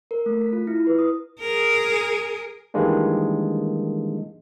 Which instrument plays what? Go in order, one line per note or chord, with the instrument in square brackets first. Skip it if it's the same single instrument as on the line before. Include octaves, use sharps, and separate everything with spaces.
[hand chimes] A#4
A3
B6
F4
E4
B4
D#6
[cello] G#4 A#4
[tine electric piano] D#3 E3 G3 G#3 A#3 D4